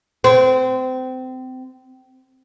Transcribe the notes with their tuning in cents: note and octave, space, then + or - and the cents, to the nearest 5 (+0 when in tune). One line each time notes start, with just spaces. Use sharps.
C4 -25